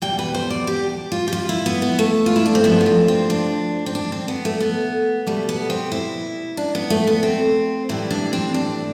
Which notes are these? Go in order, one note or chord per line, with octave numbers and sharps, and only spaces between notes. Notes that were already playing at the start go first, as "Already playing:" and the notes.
E2 B2 G3 G5
B4
C5
D5
G4
F4
G4
F4
E4
B3
B3
A3
F4
E4
D4
C4
G2 F3 B3
B3
C4
C4
D4
C4
D4
C4
B3
A3
B3
B2 G3 A3
B3
C4
E4
D4
B3
A3
B3
C4
A2 E3 G3 E4
D4
C4
D4